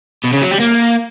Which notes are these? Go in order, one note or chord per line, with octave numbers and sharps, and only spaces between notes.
B2
C#3
F#3
G3
A#3